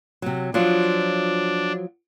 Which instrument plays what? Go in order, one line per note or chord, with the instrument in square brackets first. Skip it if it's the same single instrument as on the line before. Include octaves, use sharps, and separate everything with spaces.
[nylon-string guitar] C3 F#3
[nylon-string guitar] F3 F#3 F4 [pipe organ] D4